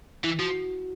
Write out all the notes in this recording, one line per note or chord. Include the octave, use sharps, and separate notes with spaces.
E3 E4
F3 F#4